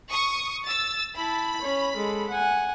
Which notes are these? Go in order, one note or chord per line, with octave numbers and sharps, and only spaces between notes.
C#6 D#6
E6 A6
E4 A5 B5
C#4 C#5
G#3 A4
F#5 G#5